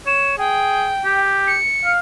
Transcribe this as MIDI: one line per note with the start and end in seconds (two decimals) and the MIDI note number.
0.06 0.34 73
0.06 0.37 100
0.38 0.90 68
0.38 1.20 79
1.05 1.55 67
1.47 1.91 97
1.85 1.99 77